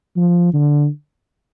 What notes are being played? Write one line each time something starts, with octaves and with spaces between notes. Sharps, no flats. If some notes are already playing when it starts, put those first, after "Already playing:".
F3
D3